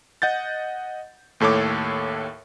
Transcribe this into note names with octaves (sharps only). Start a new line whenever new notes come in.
D#5 F#5 G6 A6
D#2 A2 A4 C#5 D6